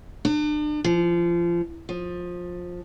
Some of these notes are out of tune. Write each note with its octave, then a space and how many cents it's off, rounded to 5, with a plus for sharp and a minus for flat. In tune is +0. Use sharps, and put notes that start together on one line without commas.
D4 +35
F3 -25
F3 +20